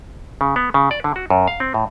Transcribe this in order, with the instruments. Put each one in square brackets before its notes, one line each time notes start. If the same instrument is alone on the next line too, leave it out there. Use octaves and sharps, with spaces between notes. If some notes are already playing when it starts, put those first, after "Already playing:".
[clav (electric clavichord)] C#3
B3
C#3
D5
D3
F#4
F#2
F5
C4
A2